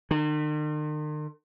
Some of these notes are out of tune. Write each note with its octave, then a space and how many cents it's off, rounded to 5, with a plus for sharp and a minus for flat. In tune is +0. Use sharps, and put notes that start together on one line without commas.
D#3 -45